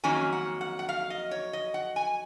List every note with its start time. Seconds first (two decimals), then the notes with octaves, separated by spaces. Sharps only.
0.04 F2 D#3 F#3 A#3 C#4 G#5
0.33 F#5
0.61 F#5
0.79 F#5
0.89 F5
1.10 D#5
1.31 C#5
1.53 D#5
1.74 F#5
1.96 G#5